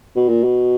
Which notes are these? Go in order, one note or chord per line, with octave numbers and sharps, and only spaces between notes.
B2
A#2
B2